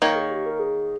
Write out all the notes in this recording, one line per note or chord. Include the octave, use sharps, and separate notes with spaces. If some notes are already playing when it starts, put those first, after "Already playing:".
D#3 A#3 A#4 C#5
G#4
G4
A#4
G#4